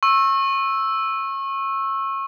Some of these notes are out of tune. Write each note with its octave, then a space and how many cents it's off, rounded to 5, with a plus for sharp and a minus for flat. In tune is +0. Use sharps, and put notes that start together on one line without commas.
C#6 -30 E6 +0